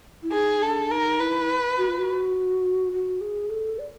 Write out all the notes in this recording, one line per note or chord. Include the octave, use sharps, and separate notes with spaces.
E4
D#4 G#4
D4 A4
D#4 A#4
E4 B4
F#4
F4
F#4
F#4
G#4
A4
D5